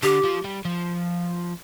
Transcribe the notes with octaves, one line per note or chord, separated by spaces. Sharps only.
D3 G4
F3
G3
F3